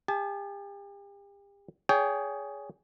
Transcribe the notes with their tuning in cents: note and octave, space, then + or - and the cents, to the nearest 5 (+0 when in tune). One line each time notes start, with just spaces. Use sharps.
G4 +40 A5 -35
G#4 +0 C#5 +35 G5 +0